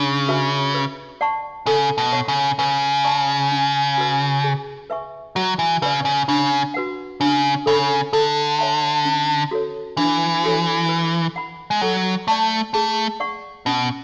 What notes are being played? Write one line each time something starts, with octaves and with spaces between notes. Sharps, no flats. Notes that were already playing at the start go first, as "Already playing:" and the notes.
Already playing: C#3 D4
F#4 B4 E5 G#5
B4
D5 F#5 A5 C#6
C#3 A4
B2
C#5 F#5 C#6
C#3
C#3 B4
D5 A5 C#6
C#4
F#4 B4
G#4
B4 E5 G#5 C#6
F#3 F#4
E3
C#3 B4 D5
C#3
C#3 D4
F#4 B4 F#5
C#3 D4
C#3 A4 C#5 G#5 B5
D3 A4
C#5 E5 G#5
C#4
F#4 A4 C#5
E3 D4
F#4 A4 C#5
B4
F#5 B5
G#3
F#3 A4
A3 D5 A5 C#6
A3 G#4
D5 F#5 C#6
B2 C#4